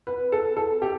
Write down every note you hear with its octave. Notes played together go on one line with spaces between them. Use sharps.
B4
A4
A4
G4